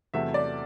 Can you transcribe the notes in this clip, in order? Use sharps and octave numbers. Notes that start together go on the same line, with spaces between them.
E2 C3 F#3 A3 E5
D5